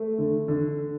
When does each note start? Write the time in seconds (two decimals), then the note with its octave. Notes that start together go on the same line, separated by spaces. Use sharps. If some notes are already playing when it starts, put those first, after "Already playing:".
Already playing: A3
0.18 D3
0.48 D3